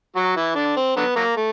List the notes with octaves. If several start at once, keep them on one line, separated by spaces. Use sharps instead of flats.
F#3 F#4
E3 E4
D3 D4
C4
D3 F#3 B3
F#3 A#3
A3